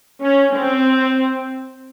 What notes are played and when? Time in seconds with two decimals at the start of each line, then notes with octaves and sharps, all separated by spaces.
0.22 C#4
0.53 C4